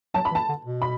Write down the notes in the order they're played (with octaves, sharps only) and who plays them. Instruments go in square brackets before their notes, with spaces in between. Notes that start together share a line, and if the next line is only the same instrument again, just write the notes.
[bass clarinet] F#3 [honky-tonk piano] A5
[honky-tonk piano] B5
[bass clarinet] E3
[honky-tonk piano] A5
[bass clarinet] D3
B2
[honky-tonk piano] B5